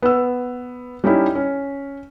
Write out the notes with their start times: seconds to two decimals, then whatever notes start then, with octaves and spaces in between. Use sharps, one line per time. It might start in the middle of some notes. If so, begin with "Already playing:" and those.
0.02 B3 E6
1.04 G3 C#4 D#4 E4 G4
1.35 C#4